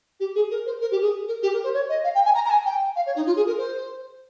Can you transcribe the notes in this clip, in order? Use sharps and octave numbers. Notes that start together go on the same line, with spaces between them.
G4
G#4
A#4
C5
A#4
G4
G#4
A#4
G4
A#4
C5
C#5
D#5
F5
G5
G#5
A#5
A#5
G#5
G5
F5
C#5
D#4
F4
G#4
A#4
C5